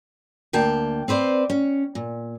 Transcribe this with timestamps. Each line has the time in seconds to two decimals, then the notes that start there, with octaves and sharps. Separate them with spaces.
0.53 D2 A#3 G5 A5
1.08 C4 B4 C5 D5
1.50 C#4
1.95 A#2